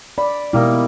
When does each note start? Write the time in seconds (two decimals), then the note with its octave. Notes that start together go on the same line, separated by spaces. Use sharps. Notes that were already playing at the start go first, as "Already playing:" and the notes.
0.18 D5 B5
0.53 B2 G3 G#3 A#3 D#4 E4